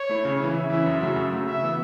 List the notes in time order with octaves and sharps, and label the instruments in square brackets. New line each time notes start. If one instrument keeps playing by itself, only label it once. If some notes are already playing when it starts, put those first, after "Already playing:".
Already playing: [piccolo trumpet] C#5
[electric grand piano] A3 E4
C#3
E3 C#4 E4
[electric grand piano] C#3 [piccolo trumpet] E5
[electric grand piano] E3 C#4 E4
F#2
C#3 A3 F#4
F#2
C#3 A3 F#4
[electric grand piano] C#3 [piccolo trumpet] E5
[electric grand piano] E3 B3